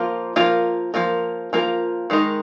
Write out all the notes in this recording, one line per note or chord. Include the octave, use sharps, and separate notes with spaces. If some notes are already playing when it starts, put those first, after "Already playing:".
Already playing: F3 A#3 F4 A#4
F3 A#3 F4 A#4
F3 A#3 F4 A#4
F3 A#3 F4 A#4
D#3 G#3 D#4 A#4